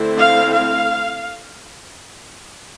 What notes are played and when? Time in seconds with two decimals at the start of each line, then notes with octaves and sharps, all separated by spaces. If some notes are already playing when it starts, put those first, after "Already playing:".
Already playing: D3 A3 C4 E4
0.18 F5
0.53 F5